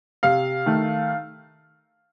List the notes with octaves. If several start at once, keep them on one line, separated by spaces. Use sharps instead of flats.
C3 F5
D#3 A3